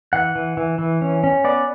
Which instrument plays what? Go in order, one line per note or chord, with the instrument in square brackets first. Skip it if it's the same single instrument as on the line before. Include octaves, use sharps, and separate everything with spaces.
[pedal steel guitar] E3 F#5
E3
E3
E3
C#4
C#4
B3 D5